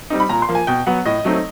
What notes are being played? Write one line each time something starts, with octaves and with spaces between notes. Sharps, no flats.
G3 C4 D#4
B5
A#2 A#5
C6
F3 A#3
G#5
B2 G5
F#3 B3 F#5
A2 D#5
F#3 A3 C4 D#4